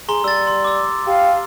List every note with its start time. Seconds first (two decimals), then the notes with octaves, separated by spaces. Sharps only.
0.09 G#4 A#5 C6 G7
0.24 G3 E6 A6
0.47 C6
0.65 D6 E6
1.07 G4 F5